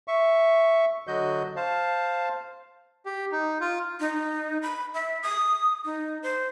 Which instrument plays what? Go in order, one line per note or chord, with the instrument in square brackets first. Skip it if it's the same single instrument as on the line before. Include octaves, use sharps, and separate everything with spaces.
[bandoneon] E5 C#6
D3 F#3 F#4 D#5 G6
C5 F5 A5
[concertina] G4
D#4
F4
[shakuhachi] D#4
B5
E5
D#6
D#4
C5